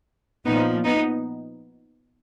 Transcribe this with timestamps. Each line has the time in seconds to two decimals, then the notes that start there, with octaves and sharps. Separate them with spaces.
0.45 A#2 F3 B3 D#4
0.85 B3 D#4